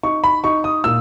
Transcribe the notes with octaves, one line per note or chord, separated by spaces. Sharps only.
D#4 C#6
B5
D#4 C#6
D#6
A#2 E6